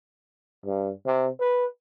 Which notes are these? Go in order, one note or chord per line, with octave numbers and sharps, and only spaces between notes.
G2
C3
B4